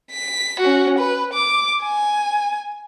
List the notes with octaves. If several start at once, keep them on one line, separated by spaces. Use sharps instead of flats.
B6
C#4 F#4
B4
D6
G#5